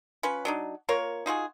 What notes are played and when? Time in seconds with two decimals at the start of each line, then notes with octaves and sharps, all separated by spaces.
0.23 C#4 F4 B4
0.45 F#3 D4 D#4
0.89 A#3 F4 A#4 C#5
1.26 D#4 F4 F#4 G#4